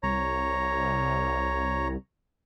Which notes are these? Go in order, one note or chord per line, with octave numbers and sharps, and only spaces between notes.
C2 C#5 A#5